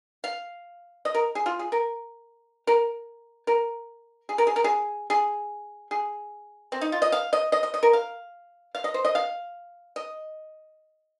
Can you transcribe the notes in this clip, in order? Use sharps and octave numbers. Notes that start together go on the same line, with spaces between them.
F5
D#5
A#4
G#4
F4
G#4
A#4
A#4
A#4
G#4
A#4
G#4
A#4
G#4
G#4
G#4
C4
D#4
F4
D#5
F5
D#5
D#5
D#5
D#5
A#4
F5
F5
D#5
C5
D#5
F5
D#5